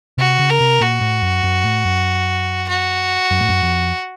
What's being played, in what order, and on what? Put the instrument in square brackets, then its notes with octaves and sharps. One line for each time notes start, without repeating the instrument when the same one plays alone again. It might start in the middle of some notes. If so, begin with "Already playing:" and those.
[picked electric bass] C3 [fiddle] F#4
[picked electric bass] C#3
[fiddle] A#4
[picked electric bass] C3
[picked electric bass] A#2 [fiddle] F#4
[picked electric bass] A2
F#2
F#2
A2
F#2
[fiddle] F#4
[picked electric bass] F#2
A2
F#2
F2